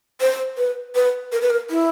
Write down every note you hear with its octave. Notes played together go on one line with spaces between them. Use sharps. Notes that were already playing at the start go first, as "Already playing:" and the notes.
C5
B4
B4
A#4
B4
A#4
E4